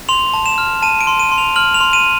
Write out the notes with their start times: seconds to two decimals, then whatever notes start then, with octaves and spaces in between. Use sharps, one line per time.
0.09 C6 F7
0.34 A5
0.46 E7
0.58 F6
0.82 A5 D#7
1.01 D7
1.07 C6
1.19 D#7
1.32 C6
1.38 F7
1.56 F6 F#7
1.74 F7
1.81 C6
1.93 D#7